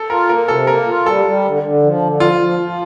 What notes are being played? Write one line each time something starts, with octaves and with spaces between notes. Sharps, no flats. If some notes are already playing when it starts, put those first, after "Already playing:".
Already playing: A4
F4 A#4
A#3 A#4
C3 A4
A#3 A#4
F4
G3 A4
G3
D3
D3
F3
D3
F3 F4
F3
F3